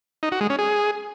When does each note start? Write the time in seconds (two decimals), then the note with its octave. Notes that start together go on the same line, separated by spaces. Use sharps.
0.23 D#4
0.32 F#4
0.41 G#3
0.50 C#4
0.59 G#4